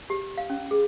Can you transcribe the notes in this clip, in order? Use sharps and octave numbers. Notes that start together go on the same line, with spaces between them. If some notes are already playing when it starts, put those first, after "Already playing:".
G4
F5
C#4
G#4